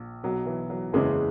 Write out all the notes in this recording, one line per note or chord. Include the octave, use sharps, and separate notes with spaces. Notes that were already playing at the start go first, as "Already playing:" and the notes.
Already playing: A#1
B1 B2 F#3
E3
F#3
F#1 E2 C#3 E3 G#3